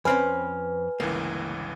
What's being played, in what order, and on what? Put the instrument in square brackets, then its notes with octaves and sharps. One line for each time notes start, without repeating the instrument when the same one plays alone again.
[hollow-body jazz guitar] F2 C4 C#4 [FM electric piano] B4 [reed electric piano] G#5 F6
[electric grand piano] G1 C#2 E3 [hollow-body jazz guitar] A#3